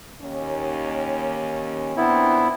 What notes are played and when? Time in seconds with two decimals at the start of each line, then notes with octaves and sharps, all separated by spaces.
0.21 D#2 C#4
1.97 A#2 B3 C4 D4 E4